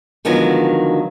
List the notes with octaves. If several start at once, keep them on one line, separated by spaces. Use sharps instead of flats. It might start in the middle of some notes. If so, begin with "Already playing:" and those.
D3 D#3 F3 F#3 G#3 B3